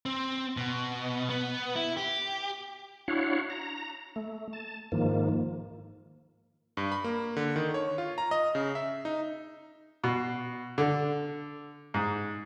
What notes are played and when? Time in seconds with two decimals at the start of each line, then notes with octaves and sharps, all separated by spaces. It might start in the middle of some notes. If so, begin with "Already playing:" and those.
0.06 C4
0.57 B2
1.30 B3
1.76 E4
1.97 G4
3.08 D4 E4 F#4 C#5 F5 F#5
3.50 A#5
4.16 A3
4.53 A5
4.92 G#2 D#3 F3 A#3
6.77 G2
6.92 B5
7.04 A#3
7.36 D3
7.56 D#3
7.74 C#5
7.98 F4
8.18 A#5
8.31 D#5
8.55 C#3
8.75 E5
9.05 D#4
10.04 B2
10.78 D3
11.94 G#2